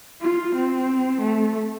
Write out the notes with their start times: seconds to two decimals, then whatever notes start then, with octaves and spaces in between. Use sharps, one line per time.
0.21 F4
0.55 C4
1.21 A3